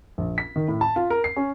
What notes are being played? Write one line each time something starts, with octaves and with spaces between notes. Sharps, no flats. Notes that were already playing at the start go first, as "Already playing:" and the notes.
A#1
B6
D#3
A2
A5
F4
A#4
C7
C#4